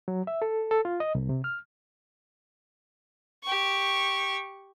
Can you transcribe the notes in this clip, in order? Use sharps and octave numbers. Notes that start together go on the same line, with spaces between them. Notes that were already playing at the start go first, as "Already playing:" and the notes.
F#3
E5
A4
A4
F4
D#5
C2
C3
F6
G4 C#6